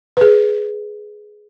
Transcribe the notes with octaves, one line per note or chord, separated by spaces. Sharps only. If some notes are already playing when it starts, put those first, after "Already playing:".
G#4 B4